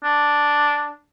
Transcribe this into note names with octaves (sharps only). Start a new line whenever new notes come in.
D4